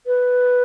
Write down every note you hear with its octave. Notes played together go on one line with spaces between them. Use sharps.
B4